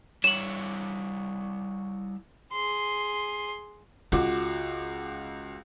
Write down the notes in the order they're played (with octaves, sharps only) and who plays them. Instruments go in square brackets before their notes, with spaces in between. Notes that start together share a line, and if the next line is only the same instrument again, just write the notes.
[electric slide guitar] G3 E4 C#5 [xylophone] E7 F#7
[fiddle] G#4 C6
[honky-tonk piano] C#2 F#4 D6 [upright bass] F4